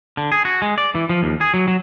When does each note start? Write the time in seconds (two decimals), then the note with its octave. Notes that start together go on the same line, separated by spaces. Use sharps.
0.17 D3
0.32 G#4
0.45 F#4
0.62 G#3
0.78 D5
0.95 E3
1.09 F3
1.23 D#2
1.41 G#4
1.54 F#3
1.68 F#3